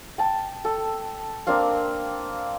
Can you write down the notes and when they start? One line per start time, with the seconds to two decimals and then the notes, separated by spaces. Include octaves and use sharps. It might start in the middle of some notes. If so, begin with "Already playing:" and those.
0.18 G5 A5
0.65 A4
1.47 A#3 C4 D4 F5